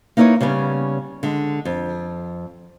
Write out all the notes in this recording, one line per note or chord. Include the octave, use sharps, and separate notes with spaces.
A#3 D#4 E4 A#4 B4 C#5
C#3 G3 B3 C#4
D3 G#3
F2